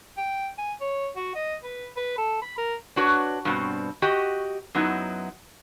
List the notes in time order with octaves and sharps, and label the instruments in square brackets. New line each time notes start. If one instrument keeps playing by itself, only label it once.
[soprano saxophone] G5
G#5
C#5
F#4
D#5
B4
B4
A4
B5
A#4
[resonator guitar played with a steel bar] D4 F#4 B4 C#5
G2 B2 C4
F#4 G4 D#5
F#2 F#3 B3 D#4 E4